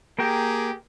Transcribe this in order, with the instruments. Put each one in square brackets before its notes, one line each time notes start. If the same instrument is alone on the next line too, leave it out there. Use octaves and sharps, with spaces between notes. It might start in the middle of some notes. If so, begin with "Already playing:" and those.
[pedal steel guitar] A#3 A#4 G5 [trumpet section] G4 G#4